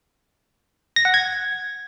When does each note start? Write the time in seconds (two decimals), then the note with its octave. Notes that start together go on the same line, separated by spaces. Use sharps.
0.96 A#6
1.05 F#5
1.14 G#6